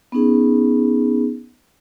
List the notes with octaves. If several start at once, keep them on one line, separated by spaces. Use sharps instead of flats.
B3 C#4 D#4 G#4